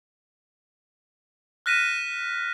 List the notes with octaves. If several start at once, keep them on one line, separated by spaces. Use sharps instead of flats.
F6 F#6 A#6 B6 D#7 E7